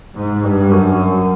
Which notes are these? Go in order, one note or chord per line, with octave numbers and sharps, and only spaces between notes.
G#2
G2
F#2